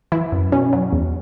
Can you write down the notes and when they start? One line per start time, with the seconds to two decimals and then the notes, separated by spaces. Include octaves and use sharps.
0.12 E3 E4
0.32 F#2
0.52 B2 C#4
0.73 F#3
0.93 E2